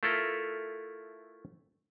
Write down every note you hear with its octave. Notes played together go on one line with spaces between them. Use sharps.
A3 E4 F4 A4 A#4